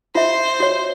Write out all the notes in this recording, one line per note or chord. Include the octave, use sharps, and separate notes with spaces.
F4 C5 E5
F#4 C#5